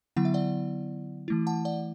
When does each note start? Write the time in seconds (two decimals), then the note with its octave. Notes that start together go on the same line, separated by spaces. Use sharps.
0.17 D3 F#3 B3 E4 F#5
0.25 E5
0.34 D5 F#5
1.28 E3 A3 E4
1.47 F#5 A5
1.65 D5 F#5